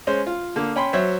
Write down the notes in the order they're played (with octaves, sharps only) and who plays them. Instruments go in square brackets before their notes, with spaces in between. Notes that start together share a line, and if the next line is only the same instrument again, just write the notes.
[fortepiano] G#3 C#4 C5
F4
D3 A#3
C#4 G5 B5 C6
F#3 C5 C#5 E5